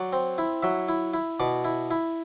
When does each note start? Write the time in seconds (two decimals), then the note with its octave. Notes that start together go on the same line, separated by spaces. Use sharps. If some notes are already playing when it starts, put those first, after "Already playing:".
Already playing: F#3 D5
0.13 C4
0.38 E4
0.63 F#3 E5
0.88 E4
1.13 E4
1.40 B2 D5
1.65 E4
1.91 E4